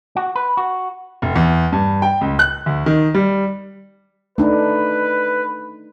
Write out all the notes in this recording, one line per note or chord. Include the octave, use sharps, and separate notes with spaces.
F#4
B4
F#4
F1
E2
G2
G5
C#2
F#6
D2
D#3
G3
A3 D4 D#4 B4